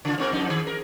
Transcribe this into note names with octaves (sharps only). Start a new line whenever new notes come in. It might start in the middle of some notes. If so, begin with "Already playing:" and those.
C#3 F4
G#2 C4 A#4
F2 D#4
D#3 G#4
A#4